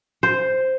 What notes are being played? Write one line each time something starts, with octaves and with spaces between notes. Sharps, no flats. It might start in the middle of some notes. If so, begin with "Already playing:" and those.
C5